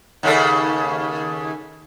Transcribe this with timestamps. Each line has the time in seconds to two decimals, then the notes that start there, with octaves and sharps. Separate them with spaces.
0.23 D#2 C#3 A4